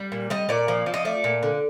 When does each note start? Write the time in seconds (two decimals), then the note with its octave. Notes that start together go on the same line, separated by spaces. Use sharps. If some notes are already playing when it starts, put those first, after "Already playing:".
Already playing: G3
0.12 A#2
0.30 G3 D#5
0.49 A#2 D5
0.68 F3
0.86 F3
0.94 D#5
1.05 A3 D5
1.24 A#2
1.43 D3